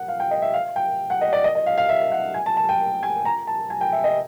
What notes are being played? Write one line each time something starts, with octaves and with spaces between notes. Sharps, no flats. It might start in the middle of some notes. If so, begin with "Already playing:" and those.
Already playing: F#5
F5
G5
D#5
E5
F5
G5
F#5
D#5
D5
D#5
D#5
F5
F5
E5
F#5
G#5
A5
A5
G5
G#5
A#5
A5
G#5
G5
E5
D#5